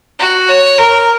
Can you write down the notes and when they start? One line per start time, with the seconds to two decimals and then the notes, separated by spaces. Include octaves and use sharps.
0.19 F#4
0.49 C#5
0.78 A#4